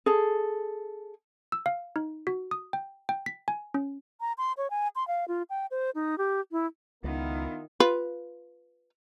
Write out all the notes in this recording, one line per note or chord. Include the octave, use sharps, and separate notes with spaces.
G#4 A4
E6
F5
D#4
F#4
D#6
G5
G5
B6
G#5
C#4
A#5
C6
C#5
G#5
C6
F5
F4
G5
C5
D#4
G4
E4
C#2 D#3 B3 E4 F4 A#4
F4 B4